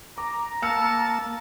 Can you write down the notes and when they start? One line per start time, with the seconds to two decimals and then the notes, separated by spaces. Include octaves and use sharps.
0.18 A#5 D6
0.62 A#3 A5 E6 F6 C#7